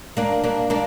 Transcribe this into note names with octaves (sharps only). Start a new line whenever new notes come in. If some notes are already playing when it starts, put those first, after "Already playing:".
A#3 D4
A#3 D4
A#3 D4